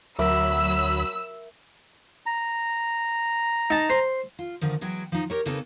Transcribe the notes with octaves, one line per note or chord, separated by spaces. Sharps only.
D2 F#3 A#4 E5 B5 D6 E6
A#5
D#4 A5
C5
F4
D3 D#3 F3
E3 F#3 G#3 F#4 G5
F3 D#4
G4 A#4 C#5
C#3 A#3 C4 D#4 A4 B4